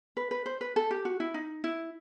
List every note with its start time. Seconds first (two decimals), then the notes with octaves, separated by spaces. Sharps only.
0.17 B4
0.31 B4
0.46 C5
0.61 B4
0.76 A4
0.91 G4
1.05 F#4
1.20 E4
1.34 D#4
1.64 E4